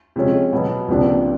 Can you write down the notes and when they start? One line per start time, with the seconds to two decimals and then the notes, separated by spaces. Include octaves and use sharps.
0.16 C3 F3 G#3 C#4
0.53 B2 F#3 B3
0.88 C#2 C3 F3 A#3 D4